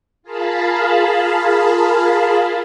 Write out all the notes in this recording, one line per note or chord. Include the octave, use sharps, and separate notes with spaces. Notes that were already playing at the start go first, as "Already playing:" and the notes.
F4 G#4 A#4 F5 A5 B5